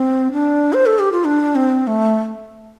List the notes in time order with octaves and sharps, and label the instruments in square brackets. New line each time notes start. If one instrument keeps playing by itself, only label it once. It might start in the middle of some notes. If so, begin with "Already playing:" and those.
Already playing: [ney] C4
D4
C5
A4
G4
F4
D4
C4
A3